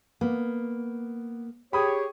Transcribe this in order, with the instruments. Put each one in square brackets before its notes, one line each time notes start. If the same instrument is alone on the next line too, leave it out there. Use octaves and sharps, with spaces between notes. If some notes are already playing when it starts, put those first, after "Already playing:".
[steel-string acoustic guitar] A#3 [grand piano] B3
[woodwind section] G4 G#4 C#5 [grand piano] B5 D#6